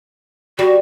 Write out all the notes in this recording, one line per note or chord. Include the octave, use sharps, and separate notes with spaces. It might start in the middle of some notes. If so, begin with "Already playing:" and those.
G3 F#4